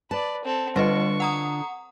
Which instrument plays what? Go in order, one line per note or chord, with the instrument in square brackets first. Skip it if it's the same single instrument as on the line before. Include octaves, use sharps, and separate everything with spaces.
[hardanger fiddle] B4 D5 [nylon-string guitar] A5
[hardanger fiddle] C4 A4
[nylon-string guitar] D3 F4 [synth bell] G3 B4 D#5 [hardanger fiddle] C#6
[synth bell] F#5 A#5 D#6